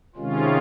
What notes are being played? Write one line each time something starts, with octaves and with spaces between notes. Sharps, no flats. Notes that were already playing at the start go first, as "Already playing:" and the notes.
C3 D#3 G#3 C#4 F4